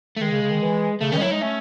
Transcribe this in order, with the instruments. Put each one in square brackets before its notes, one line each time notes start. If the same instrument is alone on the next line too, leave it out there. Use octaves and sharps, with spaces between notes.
[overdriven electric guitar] A3
[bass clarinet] D#3 [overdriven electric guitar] G#3
[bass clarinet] C#3
C#3
D#3
E3
[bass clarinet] C#3 [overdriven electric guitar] A3
[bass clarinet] D#3 [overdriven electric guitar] C#4
[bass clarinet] G#3
[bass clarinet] F#3 [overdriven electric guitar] E4
[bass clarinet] G#3 [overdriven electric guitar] D#4
[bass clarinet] A3 [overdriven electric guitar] C#4